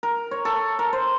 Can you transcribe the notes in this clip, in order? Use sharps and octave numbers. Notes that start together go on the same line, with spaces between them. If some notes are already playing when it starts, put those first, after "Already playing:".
A#4
C#5
A4
A#4
C5